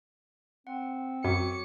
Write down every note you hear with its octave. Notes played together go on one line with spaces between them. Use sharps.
C4 F#5
F#2 F#4 C#5 D6 C#7